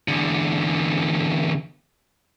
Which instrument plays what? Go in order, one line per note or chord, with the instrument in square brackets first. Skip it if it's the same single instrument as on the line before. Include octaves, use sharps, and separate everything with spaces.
[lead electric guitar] E2 D3